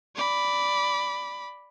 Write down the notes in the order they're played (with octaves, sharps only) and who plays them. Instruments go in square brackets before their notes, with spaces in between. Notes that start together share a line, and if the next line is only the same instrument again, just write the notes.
[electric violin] D5 B5